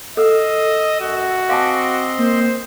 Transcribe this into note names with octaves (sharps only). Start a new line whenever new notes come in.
A4 D#5 F5 E6
F#2 F#4
C4 D#5 F5 G#5 A5 C6 D6
A#3 C5